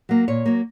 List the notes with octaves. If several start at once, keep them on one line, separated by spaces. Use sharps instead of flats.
F#3 A#3
A#2 C#5
F#3 A#3